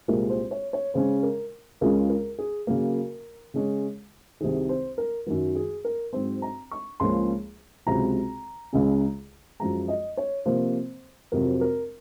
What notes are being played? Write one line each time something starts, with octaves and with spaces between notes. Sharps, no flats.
C2 A#2 G#3 C4 F4 A#4
C5
C#5
C#5
C#3 G#3 C#4 C5
A#4
C#2 C#3 G#3 C#4 F4 A#4
A#4
G#4
C#3 F#3 A#3 A#4
C#3 G#3 C#4
C2 C3 D#3 G#4
C5
A#4
F#2 D#3 F#3 A#4
G#4
A#4
G#2 F#3 C4 C5
A#5
C#6
C#2 C#3 F3 A#3 C#4 C6
C#2 C3 F#3 A#5
C#2 C#3 G#3 C#4
F#2 F3 G#3 A#5
D#5
C#5
C3 F3 A#3 C5
F2 C3 F#3 A#4
A#4